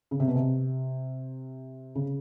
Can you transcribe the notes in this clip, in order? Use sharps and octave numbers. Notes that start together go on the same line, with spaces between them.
C#3
C3
B2
C3
C#3